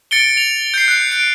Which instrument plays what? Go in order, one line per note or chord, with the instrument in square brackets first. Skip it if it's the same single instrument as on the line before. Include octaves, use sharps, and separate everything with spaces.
[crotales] A6 C#7 D7 G7
F7
G6 C7
F#6 C7
D7